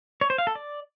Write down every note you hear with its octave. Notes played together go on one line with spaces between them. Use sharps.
C#5
C5
F5
A4
D5